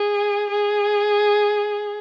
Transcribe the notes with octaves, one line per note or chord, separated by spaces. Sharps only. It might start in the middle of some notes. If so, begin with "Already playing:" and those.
Already playing: G#4
G#4